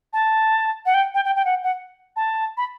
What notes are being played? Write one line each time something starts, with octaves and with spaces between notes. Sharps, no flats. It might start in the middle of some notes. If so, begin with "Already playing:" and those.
A5
F#5
G5
G5
G5
G5
F#5
F#5
A5
B5